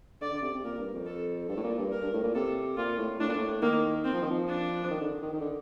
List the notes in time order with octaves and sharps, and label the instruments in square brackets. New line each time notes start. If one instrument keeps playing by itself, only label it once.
[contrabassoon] D3 [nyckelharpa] D5
[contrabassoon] D3
C3
C3
[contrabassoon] A#2 [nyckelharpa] A#4
[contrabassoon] G2
F2
[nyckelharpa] A4
[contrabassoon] G2 [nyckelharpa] A4
[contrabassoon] A2
A#2
G2
[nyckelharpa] A#4
[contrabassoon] G2
A2
A#2
[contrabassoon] C3 [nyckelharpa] A4
[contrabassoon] A#2 [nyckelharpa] F4
[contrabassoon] A2
[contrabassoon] A2 [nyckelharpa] D4
[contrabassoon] A#2
A2
[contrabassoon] D#3 [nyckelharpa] A#3
[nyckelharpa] C4
[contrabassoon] F3
D#3
F3
[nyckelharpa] D4
[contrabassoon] F3
D#3
D3
D#3
D#3
D3